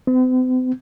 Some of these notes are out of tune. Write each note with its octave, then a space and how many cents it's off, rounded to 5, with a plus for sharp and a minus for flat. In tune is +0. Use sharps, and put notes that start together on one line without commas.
C4 -45